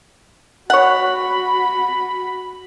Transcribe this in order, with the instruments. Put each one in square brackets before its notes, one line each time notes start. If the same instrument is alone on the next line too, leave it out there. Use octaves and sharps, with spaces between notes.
[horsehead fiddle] F#4 B5 [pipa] C#5 F#5